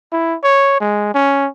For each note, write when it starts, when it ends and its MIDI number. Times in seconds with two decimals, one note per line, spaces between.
0.12 0.36 64
0.43 0.77 73
0.80 1.10 56
1.14 1.48 61